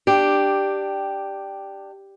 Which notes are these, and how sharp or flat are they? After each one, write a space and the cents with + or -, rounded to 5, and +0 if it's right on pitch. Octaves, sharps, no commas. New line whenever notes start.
D4 +10 G4 +0